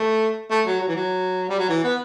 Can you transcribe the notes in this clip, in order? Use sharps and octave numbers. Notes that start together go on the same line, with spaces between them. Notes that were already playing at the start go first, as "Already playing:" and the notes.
Already playing: A3
A3
F#3
F#3
E3
F#3
G3
F#3
E3
B3